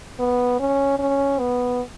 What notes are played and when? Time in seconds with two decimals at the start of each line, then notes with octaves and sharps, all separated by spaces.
0.19 B3
0.59 C#4
0.99 C#4
1.39 B3